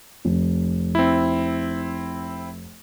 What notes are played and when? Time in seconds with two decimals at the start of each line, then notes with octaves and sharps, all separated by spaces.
0.25 F1
0.95 C4 E4